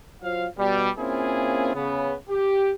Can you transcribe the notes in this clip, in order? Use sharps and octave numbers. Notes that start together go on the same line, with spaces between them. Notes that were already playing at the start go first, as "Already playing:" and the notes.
F#3 F4 C5 F5
B2 G3
A#3 C4 C#4 E4 F4 G#4
C#3 B3
G4